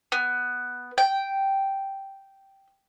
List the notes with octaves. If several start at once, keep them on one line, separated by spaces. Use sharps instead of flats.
B3
G5